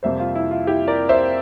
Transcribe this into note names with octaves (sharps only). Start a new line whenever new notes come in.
F2 C3 G3 A#3 C5 E5
F4
E4
F4
E4 G4
A#4 D5
C5 E5